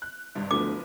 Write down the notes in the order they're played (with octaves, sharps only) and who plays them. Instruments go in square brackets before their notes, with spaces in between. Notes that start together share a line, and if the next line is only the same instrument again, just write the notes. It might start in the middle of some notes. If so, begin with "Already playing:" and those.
[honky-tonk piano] F#6
G#1 G2 C3
[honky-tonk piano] F#1 F3 B3 [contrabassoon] D2 [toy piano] D6